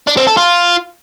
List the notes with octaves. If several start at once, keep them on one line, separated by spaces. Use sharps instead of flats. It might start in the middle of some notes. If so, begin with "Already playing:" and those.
D4
C4
A4
F4